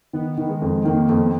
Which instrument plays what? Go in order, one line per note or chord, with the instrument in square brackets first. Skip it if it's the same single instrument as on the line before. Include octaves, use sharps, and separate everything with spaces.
[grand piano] D#3 [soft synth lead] B3
[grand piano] D#3
[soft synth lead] G#3
[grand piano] F2
[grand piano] D#3 [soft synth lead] A#3
[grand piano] F2
[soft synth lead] B3